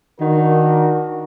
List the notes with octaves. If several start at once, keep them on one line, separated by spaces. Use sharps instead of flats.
D#3 D4 F#4 A#4